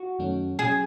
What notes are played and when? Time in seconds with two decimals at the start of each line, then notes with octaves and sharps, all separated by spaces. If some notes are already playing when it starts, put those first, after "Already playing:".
Already playing: F#4
0.19 F#2 D#3 F#3 A3 C#4
0.59 F#3 C#4 G#4